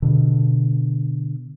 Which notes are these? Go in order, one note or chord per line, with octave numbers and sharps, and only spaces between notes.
B2 D3